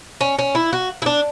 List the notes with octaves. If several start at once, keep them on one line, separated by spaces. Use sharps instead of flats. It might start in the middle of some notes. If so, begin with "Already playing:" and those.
C#4
C#4
E4
F#4
E4
D4